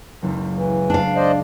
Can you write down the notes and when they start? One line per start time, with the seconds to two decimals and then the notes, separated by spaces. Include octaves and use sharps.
0.22 F#1 C#2
0.54 E3
0.90 D4 F5
1.16 C5 D5 D#5